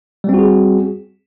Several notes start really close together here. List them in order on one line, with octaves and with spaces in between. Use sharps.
G3 C4 F#4 G#4